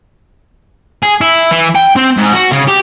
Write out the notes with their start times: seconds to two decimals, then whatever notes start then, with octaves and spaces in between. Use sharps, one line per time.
1.03 G#4
1.21 E4
1.51 E3
1.75 G5
1.96 C4
2.17 G#2
2.33 F#4
2.51 C#3
2.68 G4